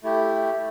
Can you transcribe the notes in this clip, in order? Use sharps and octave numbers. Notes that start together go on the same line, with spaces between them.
A3 E4 G4